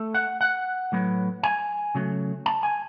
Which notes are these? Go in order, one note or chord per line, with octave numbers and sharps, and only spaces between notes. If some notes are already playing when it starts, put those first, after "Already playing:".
Already playing: A3
F#5
F#5
A2 F#3 B3
G#5
C#3 F#3 A3
A5
G#5